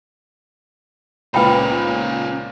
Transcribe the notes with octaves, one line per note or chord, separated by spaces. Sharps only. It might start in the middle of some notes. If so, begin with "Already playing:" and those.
C#2 A#2 C#4 B4 C5 G5 B5